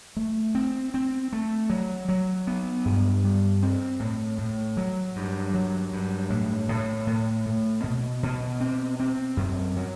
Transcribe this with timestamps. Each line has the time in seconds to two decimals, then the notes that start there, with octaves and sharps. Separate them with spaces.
0.16 A3
0.55 C4
0.94 C4
1.32 A3
1.70 F#3
2.09 F#3
2.47 B3
2.85 G2
3.24 G3
3.63 C4
4.00 A2
4.38 A2
4.77 F#3
5.16 G2
5.54 F#3
5.93 G2
6.30 A2
6.69 A2
7.07 A2
7.46 A2
7.84 B2
8.23 B2
8.60 C4
9.00 C4
9.37 F#2
9.76 F#3